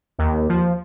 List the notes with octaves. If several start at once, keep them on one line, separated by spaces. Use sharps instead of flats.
D#2
F3